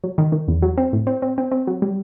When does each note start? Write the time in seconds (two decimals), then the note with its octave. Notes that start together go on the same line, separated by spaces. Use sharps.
0.04 F#3
0.18 D#3
0.32 D#3
0.48 E2
0.62 F#3
0.77 C4
0.93 A2
1.07 C4
1.22 C4
1.38 C4
1.51 C4
1.67 F#3
1.82 G3